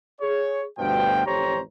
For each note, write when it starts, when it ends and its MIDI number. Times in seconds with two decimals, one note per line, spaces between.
0.21 0.64 68
0.21 0.64 73
0.79 1.25 38
0.79 1.25 43
0.79 1.25 47
0.79 1.25 53
0.79 1.25 79
1.26 1.60 33
1.26 1.60 41
1.26 1.60 67
1.26 1.60 72
1.26 1.60 73
1.26 1.60 82